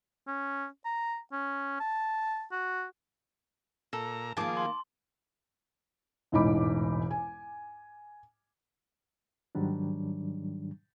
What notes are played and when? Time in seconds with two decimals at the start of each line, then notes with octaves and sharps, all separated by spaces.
0.28 C#4
0.85 A#5
1.33 C#4
1.80 A5
2.52 F#4
3.93 A#2 A4 A#5
4.37 D#3 F3 A#3 G#4 A5 D6
4.57 C6
6.32 E1 A1 G#2 D#4 B5 D6
7.11 G#5
9.55 G#2 D#3 F#3 G3 D4